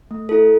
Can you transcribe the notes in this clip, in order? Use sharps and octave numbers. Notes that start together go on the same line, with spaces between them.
A3
E4 A4